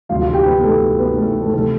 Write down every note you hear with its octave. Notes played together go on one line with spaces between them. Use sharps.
E1 D2 C3 F3 F4 F5
F4 F5
G4 G5
B3 B4
A3 A4
B3 B4
A3 A4
A3 A4
C3 F3 A3 A4